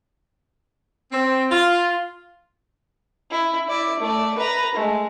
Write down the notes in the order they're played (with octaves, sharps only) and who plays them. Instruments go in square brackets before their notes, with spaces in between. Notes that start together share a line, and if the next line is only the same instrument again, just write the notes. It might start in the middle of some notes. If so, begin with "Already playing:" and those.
[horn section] C4
F4
[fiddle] E4
E4 D5
A3 D5
B4 A#5
G#3 A3